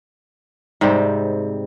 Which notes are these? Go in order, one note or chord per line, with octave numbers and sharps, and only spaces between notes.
G#2 C3 G3 C4